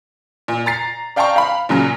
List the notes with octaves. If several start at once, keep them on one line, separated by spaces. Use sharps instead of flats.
A#2
A#5 A6 C7
D5 F5 G5 A5 A#5 C#6
F5 B5
A#2 C#3 F#3 C#4